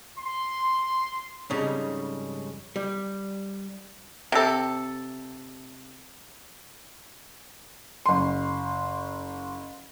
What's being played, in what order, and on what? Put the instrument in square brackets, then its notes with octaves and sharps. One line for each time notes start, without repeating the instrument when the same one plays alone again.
[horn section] C6
[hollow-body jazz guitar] F2 G#2 C#3 G3 D#4
G3
[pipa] C3 A4
[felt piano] F#1 C6